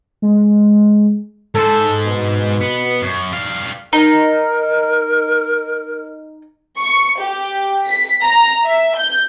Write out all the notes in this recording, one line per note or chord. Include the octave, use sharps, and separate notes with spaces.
G#3
G#2 A4 C5
B2
B3
F#2
G3 F5
D#4 A#4
C#6
G4
B6
A#5
E5
G6